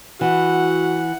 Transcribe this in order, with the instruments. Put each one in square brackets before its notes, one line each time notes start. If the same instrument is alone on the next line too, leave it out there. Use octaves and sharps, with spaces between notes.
[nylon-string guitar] E3 [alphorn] F#4 [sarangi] F#5